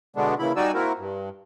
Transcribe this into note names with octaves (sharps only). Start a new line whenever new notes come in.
B2 D3 G#3 A3 B3 D4
A#2 C#3 E3 E4 B5
G3 D#4 F#4 D5 G#5 E6
A#3 C4 E4 F#4 A#4
G2